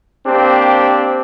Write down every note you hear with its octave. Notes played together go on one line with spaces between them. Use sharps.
A#3 C4 D4 G4